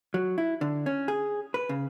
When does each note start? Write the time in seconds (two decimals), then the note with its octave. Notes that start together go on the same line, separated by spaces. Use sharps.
0.14 F#3
0.38 E4
0.61 D3
0.86 C#4
1.08 G#4
1.54 B4
1.69 C#3